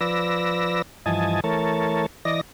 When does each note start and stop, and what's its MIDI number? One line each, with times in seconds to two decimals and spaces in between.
0.01 0.82 53
0.01 0.82 71
0.01 0.82 74
0.01 0.82 88
0.01 0.82 94
1.06 1.40 43
1.06 1.40 52
1.06 1.40 53
1.06 1.40 75
1.06 1.40 80
1.06 1.40 81
1.44 2.06 52
1.44 2.06 57
1.44 2.06 70
1.44 2.06 73
1.44 2.06 81
2.25 2.41 52
2.25 2.41 74
2.25 2.41 75
2.25 2.41 94